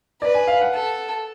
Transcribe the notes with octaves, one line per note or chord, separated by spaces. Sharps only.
B4 D5
G#5
F5
F#5
A4